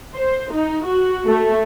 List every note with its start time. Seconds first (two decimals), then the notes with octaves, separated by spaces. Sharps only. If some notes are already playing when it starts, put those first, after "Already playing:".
0.15 C5
0.54 D#4
0.86 F#4
1.27 A3